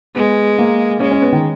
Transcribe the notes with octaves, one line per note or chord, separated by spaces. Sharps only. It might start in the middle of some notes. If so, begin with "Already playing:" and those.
G#3 B3
A#3
G#3 C#4
C#4
B3
D#3